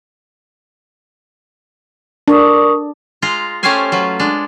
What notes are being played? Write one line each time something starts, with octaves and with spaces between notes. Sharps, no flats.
D4 A#4 C#6 D#6
G#3 F4 A#5
A3 C#4 G4 C5 F5 G#5
F#3 F4 B4
G#3 D4